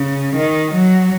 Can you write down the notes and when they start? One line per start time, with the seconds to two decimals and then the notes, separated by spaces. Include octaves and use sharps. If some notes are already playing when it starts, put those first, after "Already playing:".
Already playing: C#3
0.36 D#3
0.74 F#3